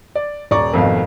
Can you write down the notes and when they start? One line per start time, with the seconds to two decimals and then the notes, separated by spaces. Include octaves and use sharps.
0.15 D5
0.51 D#1 D5 A#5 C#6
0.74 G#1 F2 B2 A3 F5